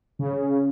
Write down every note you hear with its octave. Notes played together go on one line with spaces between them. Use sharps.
C#3